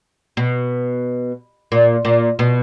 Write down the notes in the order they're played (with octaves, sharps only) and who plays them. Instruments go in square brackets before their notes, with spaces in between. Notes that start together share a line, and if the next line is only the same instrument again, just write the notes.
[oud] B2
A#2
A#2
B2